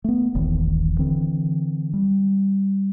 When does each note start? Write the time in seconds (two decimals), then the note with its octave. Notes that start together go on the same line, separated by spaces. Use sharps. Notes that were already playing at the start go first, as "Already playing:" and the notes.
0.04 A3 B3
0.35 D#1 A1 D#3 E3
0.99 D3 E3 C4
1.94 G3